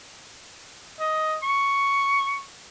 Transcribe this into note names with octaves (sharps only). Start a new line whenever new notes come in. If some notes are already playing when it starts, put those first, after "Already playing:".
D#5
C#6